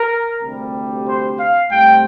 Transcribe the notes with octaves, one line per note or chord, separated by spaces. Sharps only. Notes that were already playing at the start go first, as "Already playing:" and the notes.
Already playing: A#4
D2 C3 G3
C5
F5
A2 G3 C4 G5